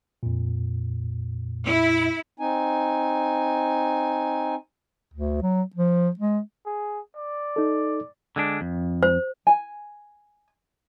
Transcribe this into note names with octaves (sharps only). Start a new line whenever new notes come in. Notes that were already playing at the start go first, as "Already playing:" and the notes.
F2 A#2
E4
C4 D#4 G#5
D2
F#3
F3
G#3
G#4
D5
D#4 A4
D3 G#3 D4
F2
C5
G#5